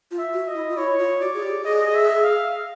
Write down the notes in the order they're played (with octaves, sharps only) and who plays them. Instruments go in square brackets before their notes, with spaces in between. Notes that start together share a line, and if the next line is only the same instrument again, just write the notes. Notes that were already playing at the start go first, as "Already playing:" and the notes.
[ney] F4
[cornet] E5
[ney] F#4
[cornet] D#5
[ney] E4
F4
[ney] E4 [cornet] C#5
[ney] F4
[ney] F#4 [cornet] D5
[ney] G#4
G4
[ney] G#4 [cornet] D#5
[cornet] E5
F5